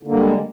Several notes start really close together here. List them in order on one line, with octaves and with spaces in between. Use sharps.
D3 A#3 G3 G#3